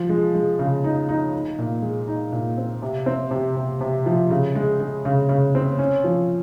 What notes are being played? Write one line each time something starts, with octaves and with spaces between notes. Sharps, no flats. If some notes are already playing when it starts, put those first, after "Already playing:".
Already playing: F3
G#3
G#3
C#3
D#4
D#4
D#4
A#2
G#3
D#4
A#2
C4
C3
C4
C3
C3
C3
F3
C#3
G#3
G#3
C#3
C#3
C4
C#4
F3